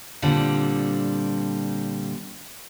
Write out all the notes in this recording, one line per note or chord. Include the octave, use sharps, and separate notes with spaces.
A#2 D3 G3 C4